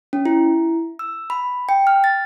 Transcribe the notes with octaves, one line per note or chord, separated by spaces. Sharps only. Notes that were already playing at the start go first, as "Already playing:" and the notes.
C#4
E4
E6
B5
G5
F6
A6